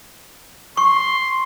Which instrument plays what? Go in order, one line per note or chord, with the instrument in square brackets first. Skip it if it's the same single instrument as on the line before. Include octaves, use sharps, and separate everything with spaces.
[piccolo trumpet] C6 [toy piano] C#6